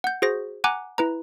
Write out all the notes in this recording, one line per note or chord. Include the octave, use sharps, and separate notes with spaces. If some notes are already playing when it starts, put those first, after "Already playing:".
F#5 G6
F#4 G#4 C5 A#6
F#5 G#5 A#5 D6 F#6
E4 B4 A#5